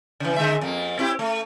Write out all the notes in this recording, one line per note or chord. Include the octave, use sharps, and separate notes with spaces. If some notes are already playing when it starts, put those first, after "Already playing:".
C#3 E3
D3 G#3 E5
F2 A#3
C4 E4 G4
A3